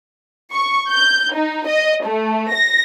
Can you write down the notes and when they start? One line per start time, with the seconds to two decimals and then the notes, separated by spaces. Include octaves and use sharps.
0.53 C#6
0.91 G6
1.35 D#4
1.68 D#5
2.06 A3
2.53 A#6